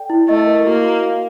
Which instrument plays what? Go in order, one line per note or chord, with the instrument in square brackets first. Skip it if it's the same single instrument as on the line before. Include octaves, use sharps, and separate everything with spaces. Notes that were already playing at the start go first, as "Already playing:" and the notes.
Already playing: [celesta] A4 D5 G5
E4
[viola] A3 [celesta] D#5
[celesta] A#4
[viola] A#3 [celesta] F#4
[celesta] F#4
F5